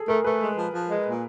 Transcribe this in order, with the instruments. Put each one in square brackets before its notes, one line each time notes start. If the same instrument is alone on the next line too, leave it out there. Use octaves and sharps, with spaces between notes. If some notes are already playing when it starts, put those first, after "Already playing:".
Already playing: [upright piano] G#4 A4
[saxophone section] A3 [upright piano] A#4
[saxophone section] A3 [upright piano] B4
[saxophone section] G#3
F3
F3
G#3
A#2